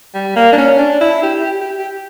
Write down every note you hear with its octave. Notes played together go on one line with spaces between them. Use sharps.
G3
A#3
D4
C#4
D4
E4
G4
G4
G4
G4